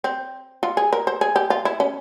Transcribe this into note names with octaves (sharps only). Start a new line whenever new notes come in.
C4
F4
G#4
A#4
C5
G#4
G4
F4
E4
C#4